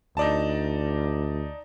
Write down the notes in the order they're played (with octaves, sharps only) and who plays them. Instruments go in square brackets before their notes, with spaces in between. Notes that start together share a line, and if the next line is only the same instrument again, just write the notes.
[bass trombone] D2 [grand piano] D#4 D5 A5